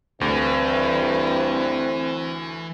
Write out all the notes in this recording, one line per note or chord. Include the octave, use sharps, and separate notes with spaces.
D2 G2 E3 C4